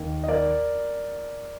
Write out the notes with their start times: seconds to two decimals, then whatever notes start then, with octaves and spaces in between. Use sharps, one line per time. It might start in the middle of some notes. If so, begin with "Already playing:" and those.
Already playing: D#2 D#3 A#3
0.23 D#5
0.28 A#4 D5